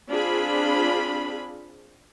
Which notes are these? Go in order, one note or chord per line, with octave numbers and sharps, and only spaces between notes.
C4 D4 F4 G#4 B5